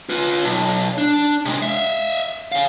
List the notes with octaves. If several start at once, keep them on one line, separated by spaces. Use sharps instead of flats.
F4 B4
B1
D4
C3 G#3
E5 F5
C#5 F5